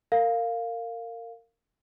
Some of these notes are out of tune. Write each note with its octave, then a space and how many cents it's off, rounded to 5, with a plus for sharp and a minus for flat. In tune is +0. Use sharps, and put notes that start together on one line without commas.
A#4 -25 F5 +0